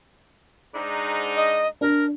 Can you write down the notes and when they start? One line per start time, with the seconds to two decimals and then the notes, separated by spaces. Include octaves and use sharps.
0.75 G#2 D4 D#4
1.36 D#5
1.81 D4 A#4